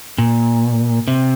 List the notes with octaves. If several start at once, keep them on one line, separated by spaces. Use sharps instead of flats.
A#2
C3